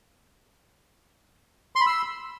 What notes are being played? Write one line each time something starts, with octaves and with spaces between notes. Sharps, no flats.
C6
B5
E6